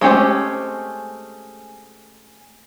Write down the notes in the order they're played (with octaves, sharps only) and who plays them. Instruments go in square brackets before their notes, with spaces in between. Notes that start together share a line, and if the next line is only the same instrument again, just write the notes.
[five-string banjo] G#3 A3 C4 C#4 G4